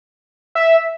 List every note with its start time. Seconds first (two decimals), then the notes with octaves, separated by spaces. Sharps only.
0.55 E5